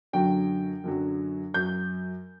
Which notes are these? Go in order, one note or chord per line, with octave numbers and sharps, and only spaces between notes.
F#2 D3 F#3 G5
F#2 D3 F#3
F#2 F#3 G6